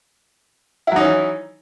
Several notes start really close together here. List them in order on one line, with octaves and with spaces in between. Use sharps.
E4 F#3 D#4 C#4 E3